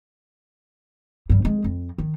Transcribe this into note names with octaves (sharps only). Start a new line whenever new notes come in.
G2 G3
G#3 C4
F2
D#3